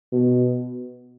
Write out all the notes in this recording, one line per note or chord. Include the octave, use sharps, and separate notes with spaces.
B2